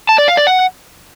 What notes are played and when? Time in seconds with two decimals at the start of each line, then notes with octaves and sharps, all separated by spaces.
0.09 A5
0.18 D5
0.28 F5
0.37 D5
0.47 F#5